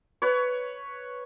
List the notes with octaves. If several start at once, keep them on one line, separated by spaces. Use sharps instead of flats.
B4 C#5